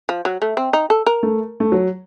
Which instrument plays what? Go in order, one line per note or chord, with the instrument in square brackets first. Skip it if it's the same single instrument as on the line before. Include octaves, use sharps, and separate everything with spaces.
[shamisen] F3
F#3
A3
C4
D#4
A4
A#4
[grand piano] A3
A3
F#3